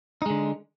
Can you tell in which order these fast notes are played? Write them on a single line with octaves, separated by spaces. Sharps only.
D#4 G#3 D3